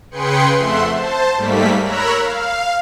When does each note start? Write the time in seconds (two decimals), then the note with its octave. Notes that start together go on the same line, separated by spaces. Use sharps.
0.11 C#3 G#4 B4 G5 C6 C#7
0.58 F2 A3 E5 F#5 C6
0.93 C5 A5
1.35 G#2 G3 A3 A#3 B6
1.83 A#4 C#5 A#5 B5 E6 F#6
2.22 F5